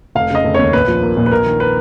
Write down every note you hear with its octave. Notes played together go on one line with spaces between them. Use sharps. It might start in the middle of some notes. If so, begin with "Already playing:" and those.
F1 F5
C#3 D#5
F1
D#2 C#5
A#1 B4
F3
A#3
A#2
B4
A#1 A#4
D#3
B4